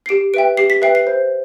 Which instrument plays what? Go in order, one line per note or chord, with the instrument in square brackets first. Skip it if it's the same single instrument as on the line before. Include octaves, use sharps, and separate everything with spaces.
[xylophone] C7
G4 D7
B4 E5 G5 D7
G4 C7
B6
B4 E5 G5 C7
C7
C5